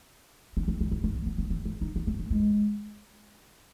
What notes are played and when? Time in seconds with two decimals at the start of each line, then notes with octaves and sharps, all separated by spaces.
0.57 C4
0.68 C4
0.81 C4
0.91 D#4
1.04 D4
1.15 C4
1.26 B3
1.38 B3
1.50 C4
1.65 C4
1.81 D#4
1.96 D4
2.07 C4
2.19 C4
2.31 G#3